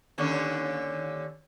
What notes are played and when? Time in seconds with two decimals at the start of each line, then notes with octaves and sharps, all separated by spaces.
0.18 D#2 D3 C#4